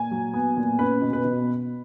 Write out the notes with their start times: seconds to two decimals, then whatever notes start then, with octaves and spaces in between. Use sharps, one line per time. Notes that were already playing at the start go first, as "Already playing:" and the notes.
Already playing: A#2 G#5
0.11 F#3
0.34 B3
0.57 A#2
0.79 C#4 B4
1.02 B2
1.13 B4
1.25 B2